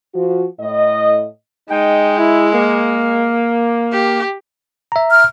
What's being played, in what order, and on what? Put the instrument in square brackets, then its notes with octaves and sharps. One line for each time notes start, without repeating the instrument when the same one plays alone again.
[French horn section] F3 F#4
A2 D#5
[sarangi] G#3 [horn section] D#4 G5
[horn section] E4
A#3
[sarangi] G4
[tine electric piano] E5 A#5
[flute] F6